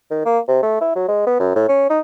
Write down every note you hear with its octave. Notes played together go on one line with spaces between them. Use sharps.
D#3
A#3
C3
A3
E4
F#3
G#3
B3
F#2
A2
C#4
D#4